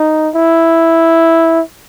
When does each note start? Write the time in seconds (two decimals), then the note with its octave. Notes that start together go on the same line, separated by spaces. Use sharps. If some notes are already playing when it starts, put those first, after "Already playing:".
Already playing: D#4
0.35 E4